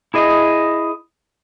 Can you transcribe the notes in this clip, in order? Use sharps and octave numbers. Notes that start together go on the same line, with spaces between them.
E4 G#4 D#5